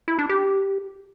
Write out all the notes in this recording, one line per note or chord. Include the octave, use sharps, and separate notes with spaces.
E4
D4
G4